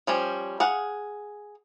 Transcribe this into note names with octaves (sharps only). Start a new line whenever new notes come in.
F3 G3 C#4
G#4 F5 F#5